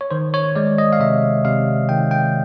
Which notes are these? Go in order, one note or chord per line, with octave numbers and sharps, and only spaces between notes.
C#5
D#3 C5
C#5
G#3 D5
D#5
F5
C3 E5
C3 F5
D#3 G5
G5